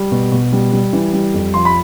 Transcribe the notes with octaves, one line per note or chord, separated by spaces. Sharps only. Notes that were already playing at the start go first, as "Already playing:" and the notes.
Already playing: G3
B2
B2
G3
G3
E3
G3
F2
F3 C6
B5